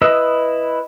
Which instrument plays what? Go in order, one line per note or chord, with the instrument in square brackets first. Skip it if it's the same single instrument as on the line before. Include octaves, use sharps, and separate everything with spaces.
[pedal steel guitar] E4 B4 D#5 D#6 E6